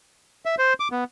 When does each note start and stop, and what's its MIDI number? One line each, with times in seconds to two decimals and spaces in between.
0.46 0.55 76
0.58 0.74 72
0.80 0.88 86
0.92 1.04 59